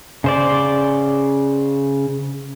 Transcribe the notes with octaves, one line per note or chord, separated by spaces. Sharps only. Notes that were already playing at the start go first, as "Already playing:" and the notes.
C#3 C5 D5